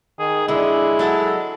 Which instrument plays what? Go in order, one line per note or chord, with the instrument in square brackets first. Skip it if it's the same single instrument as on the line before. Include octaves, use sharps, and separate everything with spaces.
[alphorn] D#3 [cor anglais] G#4
[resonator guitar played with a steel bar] D3 [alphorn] G#3 [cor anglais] E4
[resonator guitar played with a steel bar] F#3 A4 F#5